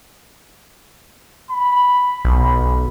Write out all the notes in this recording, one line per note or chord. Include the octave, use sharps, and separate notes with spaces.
B5
B1